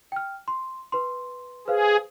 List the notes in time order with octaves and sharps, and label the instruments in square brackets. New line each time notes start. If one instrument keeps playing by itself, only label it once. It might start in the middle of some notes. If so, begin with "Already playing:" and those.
[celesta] G5 F6
C6
B4 C6
[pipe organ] G#4 [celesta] B4 C5 F5